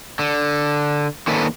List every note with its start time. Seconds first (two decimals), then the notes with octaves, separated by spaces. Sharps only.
0.19 D3
1.27 D3 D#3 A#3 C#4 A4 B4